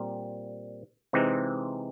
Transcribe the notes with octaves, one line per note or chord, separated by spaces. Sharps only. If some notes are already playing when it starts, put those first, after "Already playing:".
Already playing: A#2 G3 C4
C3 E3 G#3 C4 D#4